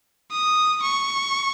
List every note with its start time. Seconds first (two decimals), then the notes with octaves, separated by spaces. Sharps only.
0.31 D#6
0.82 C#6